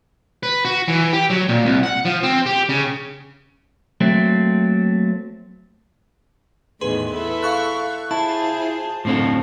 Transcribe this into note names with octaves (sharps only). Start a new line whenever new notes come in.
B4
F#4
E3
G4
F#3
A#2
C2
F#5
F3
C4
G4
C#3
F#3 A3 A#3 C4
E2 A2 D#3 G#4 B4 C6
E4 A4
F5 C#6 F#6
E4 F4 G#4 C5 A5
F#2 A2 D3 C4 A4